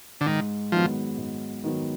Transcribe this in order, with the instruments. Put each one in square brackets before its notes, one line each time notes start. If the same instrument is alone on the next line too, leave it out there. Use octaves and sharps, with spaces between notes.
[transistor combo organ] D3
[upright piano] G#2 [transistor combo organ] D#3
[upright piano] D#3 F#3 B3 [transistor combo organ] F3
[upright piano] G#2
D#3 F#3 B3